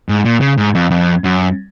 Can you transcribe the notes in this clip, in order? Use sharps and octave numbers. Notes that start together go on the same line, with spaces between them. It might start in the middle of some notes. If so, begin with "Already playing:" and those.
G#2
A#2
C#3
G#2
F2
F2
F#2